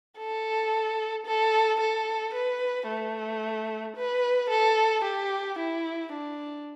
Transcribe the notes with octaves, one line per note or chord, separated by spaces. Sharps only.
A4
A4
A4
B4
A3
B4
A4
G4
E4
D4